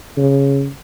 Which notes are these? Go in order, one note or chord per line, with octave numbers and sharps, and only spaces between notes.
C#3